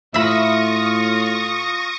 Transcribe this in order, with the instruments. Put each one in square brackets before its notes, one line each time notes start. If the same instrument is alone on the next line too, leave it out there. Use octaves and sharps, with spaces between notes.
[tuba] A2 [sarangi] F4 [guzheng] E5 B5 [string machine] C#6 D#6 A#6